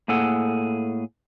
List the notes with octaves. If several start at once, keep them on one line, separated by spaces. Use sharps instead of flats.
A2 A#3 G#4 A4 F#5